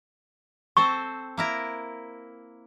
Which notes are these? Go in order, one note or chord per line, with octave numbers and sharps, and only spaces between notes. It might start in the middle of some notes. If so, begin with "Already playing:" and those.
C4 A4 C5 C#6
A#3 E4 A#4